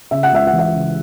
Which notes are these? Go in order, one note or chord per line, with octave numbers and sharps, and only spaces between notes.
C#3 E5
F#5
C#2 E5
F#5
E3
E5
C#3